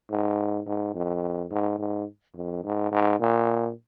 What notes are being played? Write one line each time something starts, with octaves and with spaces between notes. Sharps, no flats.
G#2
G#2
F2
G#2
G#2
F2
G#2
G#2
A#2